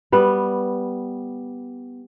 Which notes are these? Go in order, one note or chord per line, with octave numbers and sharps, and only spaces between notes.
G3 B3